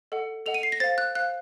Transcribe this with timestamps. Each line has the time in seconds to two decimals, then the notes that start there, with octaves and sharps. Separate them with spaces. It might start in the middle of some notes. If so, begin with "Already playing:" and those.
0.12 A4 D#5 F#5
0.46 A4 D#5 F#5 F7
0.54 D#7
0.63 C7
0.72 A#6
0.80 C5 F5 A6
0.98 F#6
1.15 C5 F5 F#6